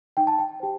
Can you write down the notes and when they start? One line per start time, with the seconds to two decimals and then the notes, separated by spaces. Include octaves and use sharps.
0.17 D#4 G5
0.27 A5
0.39 G5
0.60 G4 C5